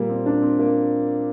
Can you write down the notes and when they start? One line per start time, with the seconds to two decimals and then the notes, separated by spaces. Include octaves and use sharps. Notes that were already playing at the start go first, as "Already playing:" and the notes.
Already playing: A#2 G3 A#3
0.09 C4
0.26 D4
0.42 C4
0.59 A#3